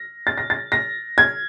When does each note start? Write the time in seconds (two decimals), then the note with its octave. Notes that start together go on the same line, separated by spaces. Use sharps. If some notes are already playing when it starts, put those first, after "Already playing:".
Already playing: A#6
0.27 A6
0.38 A#6
0.50 A6
0.72 A#6
1.18 G#6